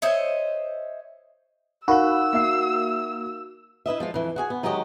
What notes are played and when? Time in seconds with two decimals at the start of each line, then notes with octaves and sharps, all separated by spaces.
0.02 C5 C#5 D#5 E5
1.88 D#4 F#4 A#4 F5 B5 E6 F#6
2.33 A#3 E5 C7
3.86 E4 B4 D#5 E5
4.00 F3 G#3 F4
4.14 F2 E3
4.36 F#4 G#4 G#5
4.50 B3
4.63 D#3 F#3 G#3 F#4 G4 D#5